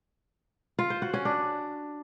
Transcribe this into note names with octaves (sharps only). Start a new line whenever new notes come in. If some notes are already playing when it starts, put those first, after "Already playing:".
F4
C5
F#4
C#4
D4